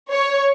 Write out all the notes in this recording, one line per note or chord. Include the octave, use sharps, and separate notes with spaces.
C#5